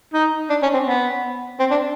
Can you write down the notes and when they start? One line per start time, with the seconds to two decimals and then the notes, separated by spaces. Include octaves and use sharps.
0.14 D#4
0.50 D4
0.63 C#4
0.74 C4
0.87 B3
1.60 C4
1.71 D4